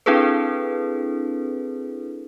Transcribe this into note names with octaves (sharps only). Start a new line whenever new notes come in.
C4 D4 E4 G#4 A4 B4